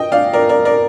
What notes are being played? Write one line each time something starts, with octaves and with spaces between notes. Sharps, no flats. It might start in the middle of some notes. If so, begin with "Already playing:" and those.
Already playing: D#5 G5
D5 F5
A#4 D5
A#4 D5
A#4 D5